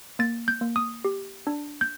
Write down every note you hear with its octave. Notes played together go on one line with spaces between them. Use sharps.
A#3 A6
G6
A#3
D#6
G4
D4
G6